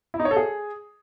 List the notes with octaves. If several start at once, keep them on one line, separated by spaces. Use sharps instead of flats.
E4
D#4
C#5
A4
G#4